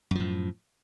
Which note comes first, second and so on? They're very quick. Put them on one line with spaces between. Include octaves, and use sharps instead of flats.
F#2 F3 A2